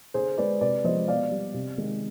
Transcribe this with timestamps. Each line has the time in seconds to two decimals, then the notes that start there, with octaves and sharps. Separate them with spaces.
0.14 D3 G#4 C5
0.38 G#3 B4 D5
0.61 C3 B4 D5
0.84 F3 G#3 C5 D#5
1.08 B2 D5 F5
1.32 G3
1.54 C3
1.78 D#3 G#3